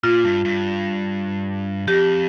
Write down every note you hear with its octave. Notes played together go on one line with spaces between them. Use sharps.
A#2 F4
G2
G2
F2 G4